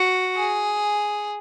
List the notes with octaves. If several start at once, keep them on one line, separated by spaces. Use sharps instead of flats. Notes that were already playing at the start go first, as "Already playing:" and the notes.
Already playing: F#4
G#4